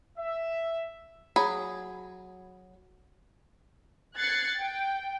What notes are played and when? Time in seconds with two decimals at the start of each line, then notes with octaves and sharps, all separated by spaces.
0.18 E5
1.36 F#3 G#4 B5
4.18 F#6 G#6 A6 C7 C#7
4.60 G5